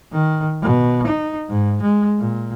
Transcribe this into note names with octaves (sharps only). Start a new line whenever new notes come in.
D#3
B2
D#4
G#2
G#3
A#2